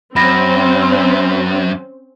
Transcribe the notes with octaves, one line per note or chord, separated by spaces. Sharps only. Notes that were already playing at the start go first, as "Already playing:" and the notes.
F#2 C4 C#4 C5 B5 A#6